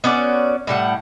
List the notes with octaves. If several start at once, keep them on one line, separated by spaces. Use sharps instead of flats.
B3 C#4 F#4 D5
A2 G3 F#5